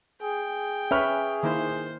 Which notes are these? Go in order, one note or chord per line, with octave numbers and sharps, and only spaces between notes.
G#4 G5
C#4 B4 E5 C#6 F6
D#3 A#3 E4 C5